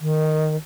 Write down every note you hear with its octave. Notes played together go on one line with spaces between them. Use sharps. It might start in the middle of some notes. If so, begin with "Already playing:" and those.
D#3